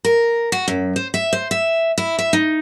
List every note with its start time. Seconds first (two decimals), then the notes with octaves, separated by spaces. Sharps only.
0.05 A#4
0.52 F#4
0.68 F#2
0.96 C5
1.14 E5
1.33 C5
1.51 E5
1.98 E4
2.19 E5
2.33 D#4